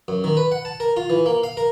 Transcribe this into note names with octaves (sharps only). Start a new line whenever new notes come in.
F#2
D#3
B4
F#5
A5
A#4
F4
E3
A#3
F5
A#4